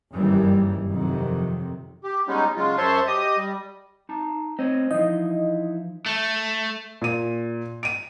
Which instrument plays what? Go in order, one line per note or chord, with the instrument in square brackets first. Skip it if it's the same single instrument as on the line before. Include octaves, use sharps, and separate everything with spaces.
[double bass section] F#1 G2 D#3 E3 G3
F2 C3 D#3 F#3
[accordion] G4
G3 G#3 B3 C#4 D#4
C#3 F#3 G#3 F4
F#2 C5 C#5 E5 A5 C6
G4 D#5 D#6
G3
[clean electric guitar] D#4 A5
[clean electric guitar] A3 C#5 D#5 [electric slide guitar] C4
[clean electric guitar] E3 F3 [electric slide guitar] D#4 E4 [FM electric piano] D#5
[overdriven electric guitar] A3
[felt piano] A#2 D#7
D7 D#7